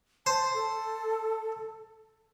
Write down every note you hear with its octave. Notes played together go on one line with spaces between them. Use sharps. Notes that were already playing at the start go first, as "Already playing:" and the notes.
C5 A5
A4